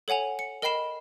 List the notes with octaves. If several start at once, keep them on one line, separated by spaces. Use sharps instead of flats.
A4 C#5 F#5 G#5 F7
C#7
A#4 D#5 G5 B5 C7 E7